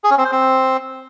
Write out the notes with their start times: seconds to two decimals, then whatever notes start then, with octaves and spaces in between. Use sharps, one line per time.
0.04 G#4
0.11 C#4
0.18 C4
0.25 C5
0.32 C4